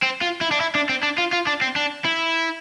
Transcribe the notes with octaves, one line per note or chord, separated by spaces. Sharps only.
C4
F4
E4
D4
E4
D4
C4
D4
F4
F4
D4
C4
D4
E4